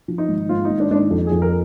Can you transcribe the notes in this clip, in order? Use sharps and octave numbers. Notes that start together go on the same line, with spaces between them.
F3
D#4
G#1
G#2 F4
G#1 D#4
D4
G#1 D4 D#4
F2
F2 G#4
A#4